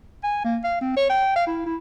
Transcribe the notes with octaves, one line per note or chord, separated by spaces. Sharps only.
G#5
A#3
F5
C4
C#5
G5
F5
E4
E4